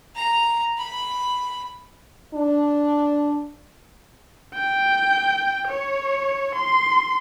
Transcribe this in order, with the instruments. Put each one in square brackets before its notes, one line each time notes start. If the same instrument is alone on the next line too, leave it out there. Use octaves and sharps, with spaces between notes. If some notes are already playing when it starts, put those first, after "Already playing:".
[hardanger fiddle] A#5
B5
[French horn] D4
[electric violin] G5
C#5
C6